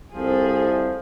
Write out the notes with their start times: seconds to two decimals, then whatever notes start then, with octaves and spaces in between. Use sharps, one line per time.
0.14 C2 F3 G#4 A4